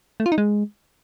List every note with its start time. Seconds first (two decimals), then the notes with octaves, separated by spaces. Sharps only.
0.20 A3
0.26 F4
0.32 D#4
0.38 G#3